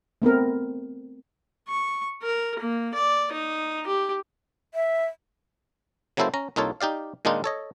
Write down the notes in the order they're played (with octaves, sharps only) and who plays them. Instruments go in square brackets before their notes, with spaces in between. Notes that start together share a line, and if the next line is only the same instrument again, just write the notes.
[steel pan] A3 B3 C4 A#4
[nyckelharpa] C#6
A#4
A#3
D5
D#4
G4
[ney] E5
[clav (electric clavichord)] C#3 F#3 A#3 E4 A4 C5
C#4 A#5
C2 A#3 D#4 F4 A4 C#5
D#4 G4 D5 F5
A#2 D#3 G#3 D4 D#4 F4
A4 C#5 D#5